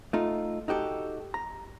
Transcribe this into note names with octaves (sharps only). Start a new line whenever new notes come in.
A3 D#4 F4
D#4 F#4 G4 A4
A#5